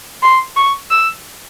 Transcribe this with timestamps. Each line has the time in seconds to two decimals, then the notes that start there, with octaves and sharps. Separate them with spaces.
0.23 C6
0.56 C#6
0.91 E6